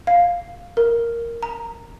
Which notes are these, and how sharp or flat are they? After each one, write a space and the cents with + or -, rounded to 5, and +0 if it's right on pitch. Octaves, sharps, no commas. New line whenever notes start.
F5 +5
A#4 +0
A#5 -15